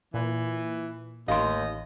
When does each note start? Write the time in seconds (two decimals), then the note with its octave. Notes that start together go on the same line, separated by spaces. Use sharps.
0.14 A#2 E3
1.28 A1 D#2 D#5 F5 C6